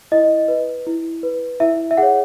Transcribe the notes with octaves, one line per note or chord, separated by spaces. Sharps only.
E4 D#5
B4
E4
B4
E4 E5
E5
G#4 C#5 F#5